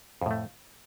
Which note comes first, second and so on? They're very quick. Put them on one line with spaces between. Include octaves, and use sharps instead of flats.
F2 A2 A3